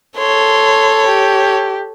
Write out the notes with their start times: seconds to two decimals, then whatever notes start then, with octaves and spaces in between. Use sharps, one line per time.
0.18 A4 C#5 C6
1.08 G4